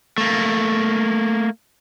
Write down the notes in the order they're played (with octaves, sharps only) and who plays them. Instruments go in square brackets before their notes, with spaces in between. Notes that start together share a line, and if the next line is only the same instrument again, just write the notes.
[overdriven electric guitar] A3 A#3